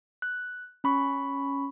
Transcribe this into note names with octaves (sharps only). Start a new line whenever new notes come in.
F#6
C#4 B5 C#6